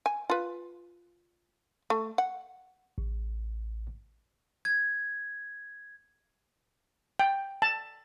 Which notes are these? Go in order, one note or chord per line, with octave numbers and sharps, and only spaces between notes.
G#5
F4 B4
A3
F#5
A1
G#6
G5
A5